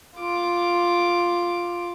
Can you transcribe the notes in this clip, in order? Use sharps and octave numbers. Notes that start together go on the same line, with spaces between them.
F4 D6